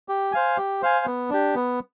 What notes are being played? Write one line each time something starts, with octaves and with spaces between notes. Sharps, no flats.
G4
C5 F5 G#5
G4
C5 F5 G#5
B3
D4 G4
B3